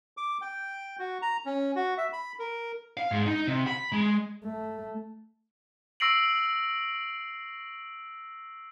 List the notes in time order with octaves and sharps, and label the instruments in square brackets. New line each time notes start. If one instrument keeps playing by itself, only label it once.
[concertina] D6
G5
F#4
A#5
C#4
F#4
E5
B5
A#4
[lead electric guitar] F5
G#2
D#4
C3
B5
G#3
[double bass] A3
[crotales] C#6 E6 A#6 C7 D7 F#7